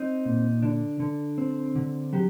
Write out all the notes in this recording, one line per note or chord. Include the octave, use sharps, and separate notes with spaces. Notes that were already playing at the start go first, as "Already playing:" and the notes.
Already playing: C4 D#4
A#2
D3 D4
D3
C4
D3
F#3 G4